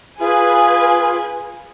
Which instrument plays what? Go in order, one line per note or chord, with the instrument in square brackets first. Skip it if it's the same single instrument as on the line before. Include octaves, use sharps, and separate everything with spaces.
[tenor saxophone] F4 [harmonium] G#4 [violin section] B4 G#5